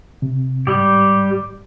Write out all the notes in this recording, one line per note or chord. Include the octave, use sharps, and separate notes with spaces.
C3
G#2 G3 G4